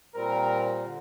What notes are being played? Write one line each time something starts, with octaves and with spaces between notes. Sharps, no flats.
A#2 G3 C4 A#4
D3